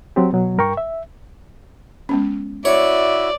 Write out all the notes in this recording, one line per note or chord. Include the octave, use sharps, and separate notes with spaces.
F#3 C4 G4
B2 F#3
G2 A#4 G5 C#6
E5
G#3 B3 C#4
E4 F#4 C#5 D5 E5